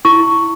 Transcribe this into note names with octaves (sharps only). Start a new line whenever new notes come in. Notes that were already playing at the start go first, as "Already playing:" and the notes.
E4 C#6